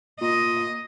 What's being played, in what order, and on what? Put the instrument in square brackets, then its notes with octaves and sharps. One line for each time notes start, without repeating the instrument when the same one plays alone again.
[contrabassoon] A#2 [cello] D#5